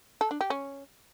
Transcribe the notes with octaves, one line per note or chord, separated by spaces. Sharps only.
A4
D4
G4
C#4